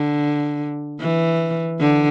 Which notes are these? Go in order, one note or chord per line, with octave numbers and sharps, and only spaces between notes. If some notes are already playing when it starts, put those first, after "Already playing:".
Already playing: D3
E3
D3